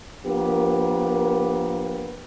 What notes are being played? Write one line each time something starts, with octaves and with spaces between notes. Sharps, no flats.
F3 A#3 B3 D4 G4 A#4